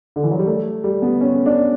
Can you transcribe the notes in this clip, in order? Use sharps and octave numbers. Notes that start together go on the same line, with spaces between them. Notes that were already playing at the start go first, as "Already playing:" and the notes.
D3
E3
F#3
G3
A3
G3
B3
C#4
D4